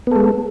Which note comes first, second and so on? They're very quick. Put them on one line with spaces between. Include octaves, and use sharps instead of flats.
B3 A4 G#3